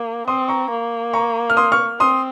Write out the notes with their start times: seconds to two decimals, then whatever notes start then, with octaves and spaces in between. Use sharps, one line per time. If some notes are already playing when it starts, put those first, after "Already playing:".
Already playing: A#3
0.27 C4 C6 D#6
0.48 A#5 C#6
0.70 A#3
1.13 A#5 C#6
1.50 F6
1.57 C6 D#6
1.72 C#6 F6
2.00 C4 C6 D#6